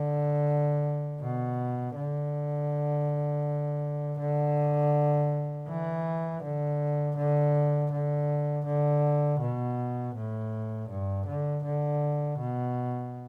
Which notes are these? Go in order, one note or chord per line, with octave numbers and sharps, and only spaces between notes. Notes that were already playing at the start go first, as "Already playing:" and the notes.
Already playing: D3
B2
D3
D3
E3
D3
D3
D3
D3
B2
A2
G2
D3
D3
B2